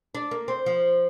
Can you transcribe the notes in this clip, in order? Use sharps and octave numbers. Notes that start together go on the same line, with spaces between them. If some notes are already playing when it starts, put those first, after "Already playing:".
D4
A#3
C4
F3